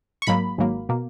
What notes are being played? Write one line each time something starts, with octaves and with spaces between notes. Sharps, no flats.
C#6
G#1 G#2 F#3 A#3 B5
G#1 G#2 F#3 A#3
B2 A#3